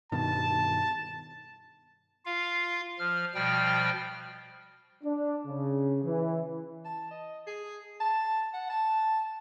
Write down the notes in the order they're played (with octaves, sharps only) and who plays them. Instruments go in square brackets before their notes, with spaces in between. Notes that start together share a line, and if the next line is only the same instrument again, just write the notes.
[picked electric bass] G2 B2 D#3 [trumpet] A5
[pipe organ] F4 F5
F3 F6
B2 F3 G3 G5 F6
[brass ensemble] D4
C#3
E3
[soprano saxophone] A5
D#5
G#4
A5
F#5
A5